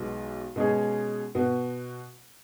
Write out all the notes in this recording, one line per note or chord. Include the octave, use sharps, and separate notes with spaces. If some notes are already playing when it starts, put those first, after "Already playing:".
Already playing: B1 B2 G#3
B2 G#3 C#4 G#4
B2 B3 F#4